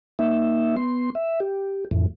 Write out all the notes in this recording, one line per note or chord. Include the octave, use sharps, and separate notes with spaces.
A#3 D#4 E5
B3 C6
E5
G4
F2 A2 E3